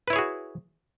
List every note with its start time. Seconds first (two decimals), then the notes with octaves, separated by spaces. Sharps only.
0.08 B4
0.10 E4
0.13 C#5
0.16 G#4
0.18 F#4